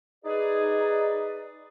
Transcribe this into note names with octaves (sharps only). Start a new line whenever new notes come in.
D#4 G#4 B4 D5